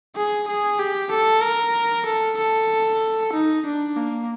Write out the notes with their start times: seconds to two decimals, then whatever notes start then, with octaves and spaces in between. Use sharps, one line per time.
0.16 G#4
0.48 G#4
0.79 G4
1.11 A4
1.43 A#4
2.06 A4
2.38 A4
3.33 D#4
3.66 D4
3.97 A#3